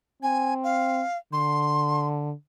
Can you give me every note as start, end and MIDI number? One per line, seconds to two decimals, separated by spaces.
0.23 1.04 60
0.23 0.54 80
0.64 1.17 77
1.33 2.33 50
1.33 2.07 84